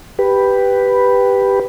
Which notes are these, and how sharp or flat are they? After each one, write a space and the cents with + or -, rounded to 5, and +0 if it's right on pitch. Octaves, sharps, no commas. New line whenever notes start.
G4 +0 B4 +0